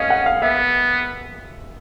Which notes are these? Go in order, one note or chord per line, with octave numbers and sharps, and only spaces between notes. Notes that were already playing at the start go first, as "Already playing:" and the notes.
Already playing: C#4 D#5 F5
F#5
F5
B3 E5